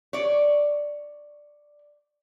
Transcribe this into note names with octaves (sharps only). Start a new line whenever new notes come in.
C#5 D5